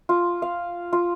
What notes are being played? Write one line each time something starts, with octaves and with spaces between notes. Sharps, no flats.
F4
F5
F4